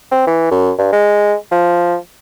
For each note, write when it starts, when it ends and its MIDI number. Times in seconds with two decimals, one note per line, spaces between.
0.12 0.25 60
0.27 0.47 52
0.51 0.71 42
0.79 0.92 43
0.92 1.35 56
1.51 1.96 53